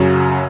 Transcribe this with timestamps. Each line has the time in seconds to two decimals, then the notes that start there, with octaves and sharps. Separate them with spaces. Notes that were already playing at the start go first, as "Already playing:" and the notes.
Already playing: F#2 C#3 F#3